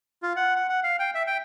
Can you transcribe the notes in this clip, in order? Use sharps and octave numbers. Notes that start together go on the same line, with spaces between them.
F4
F#5
F#5
F#5
F5
G5
E5
G5